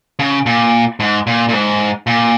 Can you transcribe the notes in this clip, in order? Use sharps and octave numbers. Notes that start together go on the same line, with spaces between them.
C#3
A#2
G#2
A#2
A#2
G#2
A#2